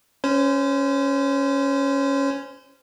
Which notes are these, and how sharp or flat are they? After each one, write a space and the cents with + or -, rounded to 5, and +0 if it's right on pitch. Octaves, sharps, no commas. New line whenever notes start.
C#4 +0 C5 -30